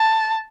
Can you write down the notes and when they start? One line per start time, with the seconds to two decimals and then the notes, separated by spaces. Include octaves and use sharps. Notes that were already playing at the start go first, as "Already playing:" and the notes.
Already playing: A5